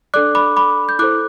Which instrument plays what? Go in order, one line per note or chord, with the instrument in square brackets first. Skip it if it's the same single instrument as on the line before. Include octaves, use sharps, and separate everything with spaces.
[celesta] D4 A4 D5 D6 F#6
B5 D6
B5 D6
G6
E4 A4 C5 D6 F#6